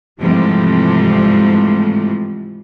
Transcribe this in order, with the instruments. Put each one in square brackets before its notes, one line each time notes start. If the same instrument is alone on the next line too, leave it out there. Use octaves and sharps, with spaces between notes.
[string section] G#2 C3 E3 F3 G3 A3